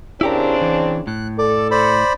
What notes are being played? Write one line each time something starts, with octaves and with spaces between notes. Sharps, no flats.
C#3 C4 D4 E4 G4 A#4
E3
A2 F#6
A4 D5 D6
C5 D5 B5